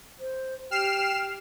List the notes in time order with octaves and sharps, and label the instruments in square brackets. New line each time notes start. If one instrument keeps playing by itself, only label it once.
[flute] C5
[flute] G4 [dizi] G5 [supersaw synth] F6 C7 E7